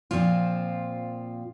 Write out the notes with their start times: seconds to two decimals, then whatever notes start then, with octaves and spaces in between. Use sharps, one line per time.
0.11 A#2 F3 C4 F4